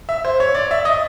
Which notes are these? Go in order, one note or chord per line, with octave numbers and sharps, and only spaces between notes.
E5
C5
C#5
D5
E5
D#5